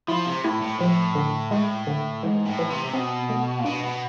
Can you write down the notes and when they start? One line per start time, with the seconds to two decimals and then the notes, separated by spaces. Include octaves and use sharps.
0.08 F3 E4
0.26 C3
0.44 A2 E4
0.62 A2
0.80 A2 F3
1.15 D3
1.51 A2 G#3
1.87 D3
2.23 G#2 E3
2.46 A2
2.59 E3
2.70 C3
2.84 C3
2.93 B2 C4
3.30 A3
3.59 A#2
3.65 B2 D4
3.83 B2